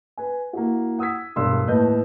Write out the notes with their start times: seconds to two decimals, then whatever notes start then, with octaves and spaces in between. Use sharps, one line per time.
0.17 B4 G#5
0.53 A#3 E4 F#4
0.99 F#5 D#6 E6 G#6 B6
1.36 E1 G2 D5 C6 E6
1.67 D#2 A2 B4 D#5 A5 G6